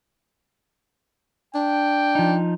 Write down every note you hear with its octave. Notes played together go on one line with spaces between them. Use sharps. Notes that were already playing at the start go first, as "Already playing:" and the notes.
D4 G5
F3 D#4